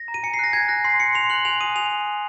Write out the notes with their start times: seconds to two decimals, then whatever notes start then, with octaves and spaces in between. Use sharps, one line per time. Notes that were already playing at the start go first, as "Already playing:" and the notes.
Already playing: A#6
0.08 A#5
0.14 D#7
0.23 G#5 C#7
0.34 C7
0.39 F#6 A#6
0.53 G#5 G#6
0.68 F#6 A#6
0.84 C6 C7
1.00 C6 C#7
1.15 C6 F7
1.30 F#6 F#7
1.45 G#5 F7
1.61 D#6 D#7
1.75 G#5 F7